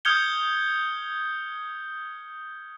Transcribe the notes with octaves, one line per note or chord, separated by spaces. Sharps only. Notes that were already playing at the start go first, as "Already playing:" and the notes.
D#6 F6 G6 G#6 C#7 G7